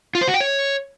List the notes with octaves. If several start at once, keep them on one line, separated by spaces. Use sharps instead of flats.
F4
C5
F#4
G5
C#5